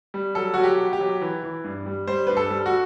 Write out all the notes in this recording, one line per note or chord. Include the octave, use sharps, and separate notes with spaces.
G3
F#3 A4
F#3 F#4
G4
B2
G4
F#3
E3
E3
G2
G3
G3 C5
G2 B4
A4
G3
F#4